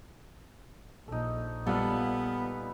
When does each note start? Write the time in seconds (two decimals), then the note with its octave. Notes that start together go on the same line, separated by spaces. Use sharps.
1.08 A#1 D#4 A4
1.66 A#2 G3 B3 A4 B4 F5